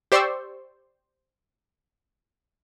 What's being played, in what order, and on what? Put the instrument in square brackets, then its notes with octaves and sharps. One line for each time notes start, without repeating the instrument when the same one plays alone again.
[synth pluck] G4 C5 D5 C6 C#6 E6